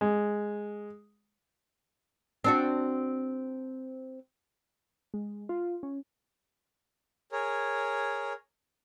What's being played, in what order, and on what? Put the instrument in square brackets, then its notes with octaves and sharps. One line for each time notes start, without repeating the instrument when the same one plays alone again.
[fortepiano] G#3
[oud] C4 D4 F#4
[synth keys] G#3
F4
C#4
[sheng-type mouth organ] G#4 A#4 C#5